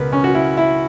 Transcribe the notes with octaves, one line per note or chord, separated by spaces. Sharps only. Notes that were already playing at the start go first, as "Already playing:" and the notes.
Already playing: C#2 B2 A#4 B4
C#4
F#4
E4
E4